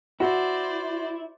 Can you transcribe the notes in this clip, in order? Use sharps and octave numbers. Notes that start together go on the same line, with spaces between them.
E4 F#4 C5 D5